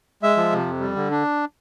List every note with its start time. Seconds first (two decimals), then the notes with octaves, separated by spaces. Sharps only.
0.23 G#3 E5
0.37 F3
0.52 C3
0.66 F2
0.81 G3
0.96 D3
1.11 D4